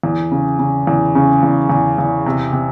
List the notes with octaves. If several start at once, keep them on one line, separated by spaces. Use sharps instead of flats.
E2
C#3
C#3
E2
C#3
E2
E2
E2
C3
C3